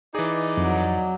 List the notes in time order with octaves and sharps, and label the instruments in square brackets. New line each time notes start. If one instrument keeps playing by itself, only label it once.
[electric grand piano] E3 G#4 [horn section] D#4 D5
[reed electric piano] F2 [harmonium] F#3